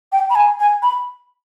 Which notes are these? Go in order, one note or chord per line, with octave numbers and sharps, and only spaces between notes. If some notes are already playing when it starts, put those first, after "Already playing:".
G5
B5
G#5
G#5
B5